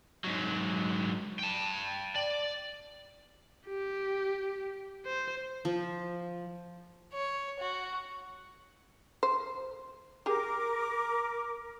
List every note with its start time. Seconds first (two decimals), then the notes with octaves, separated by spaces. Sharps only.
0.24 G#2 F#3
1.39 G5 A5
2.16 D5
3.67 G4
5.06 C5
5.65 F3
7.14 C#5
7.59 F#4
9.23 C5
10.26 G4 G#4 A#4 D6